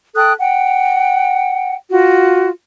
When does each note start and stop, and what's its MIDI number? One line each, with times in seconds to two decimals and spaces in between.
0.15 0.32 69
0.15 0.32 79
0.15 0.32 87
0.15 0.32 90
0.39 1.74 78
0.39 1.74 79
1.89 2.49 65
1.89 2.49 66